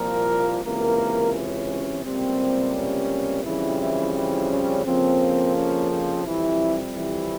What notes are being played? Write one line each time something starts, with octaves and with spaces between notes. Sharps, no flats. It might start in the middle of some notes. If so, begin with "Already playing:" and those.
Already playing: C2 A#2 F3 A#3 A#4
C#2 C3 E3 A#3 A#4
C#4
C#2 C3 G3 A#3 C4
C#4
F2 C#3 E3 G3 C4 E4
E3 E4
E3 E4
C#4
F2 C#3 F3 A#3 C4
C#4
C4
F2 C3 E3 G3 E4
E3 E4